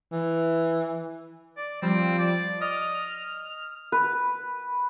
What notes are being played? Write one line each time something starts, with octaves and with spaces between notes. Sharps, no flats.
E3
D5
F3 G3 C4
D5
D#5 F6
B4